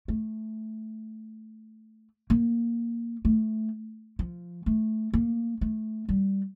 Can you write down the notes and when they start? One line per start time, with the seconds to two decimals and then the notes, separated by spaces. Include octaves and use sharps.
0.08 A3
2.30 A#3
3.25 A3
4.19 F3
4.66 A3
5.14 A#3
5.61 A3
6.09 G3